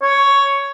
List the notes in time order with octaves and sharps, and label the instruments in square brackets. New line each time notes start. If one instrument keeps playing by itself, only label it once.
[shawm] C#5